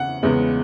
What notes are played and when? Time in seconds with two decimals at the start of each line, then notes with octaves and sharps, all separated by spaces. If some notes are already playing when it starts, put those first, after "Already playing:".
Already playing: E2 C#3 F#5
0.23 E2 C#3 G#3 B3